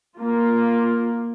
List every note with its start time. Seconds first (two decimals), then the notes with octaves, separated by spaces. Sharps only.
0.17 A#3 F4